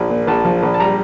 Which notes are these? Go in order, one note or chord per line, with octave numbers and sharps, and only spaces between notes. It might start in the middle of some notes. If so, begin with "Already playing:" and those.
Already playing: A#1 F3
A#2
A#1 A5
F3
A#1
A5
G3 A#5